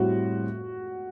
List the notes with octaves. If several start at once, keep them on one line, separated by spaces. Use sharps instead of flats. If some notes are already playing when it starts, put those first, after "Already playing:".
Already playing: A2 G3 C4 F#4